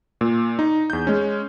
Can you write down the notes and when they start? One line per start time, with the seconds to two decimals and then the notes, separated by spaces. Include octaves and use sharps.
0.21 A#2
0.59 D#4
0.90 E2 G6
1.07 G#3 C#4